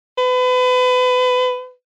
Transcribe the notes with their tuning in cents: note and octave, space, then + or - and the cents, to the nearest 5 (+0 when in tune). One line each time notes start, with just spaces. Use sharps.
B4 +30